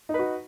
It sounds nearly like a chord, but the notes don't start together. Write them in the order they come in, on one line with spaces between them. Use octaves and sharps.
D#4 B4 F#4